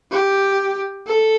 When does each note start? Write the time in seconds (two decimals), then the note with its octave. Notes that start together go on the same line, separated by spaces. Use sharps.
0.11 G4
1.07 A4